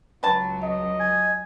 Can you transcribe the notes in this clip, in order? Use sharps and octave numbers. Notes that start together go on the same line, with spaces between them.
C#2 F#3 B4 A5
D#5
G#5